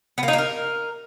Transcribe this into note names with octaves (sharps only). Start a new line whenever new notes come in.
B3
A#3
D#4
A#3
A#4